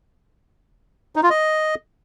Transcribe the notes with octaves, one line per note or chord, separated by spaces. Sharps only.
D#4
F4
D#5